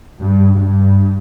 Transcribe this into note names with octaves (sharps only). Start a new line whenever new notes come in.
G2
G2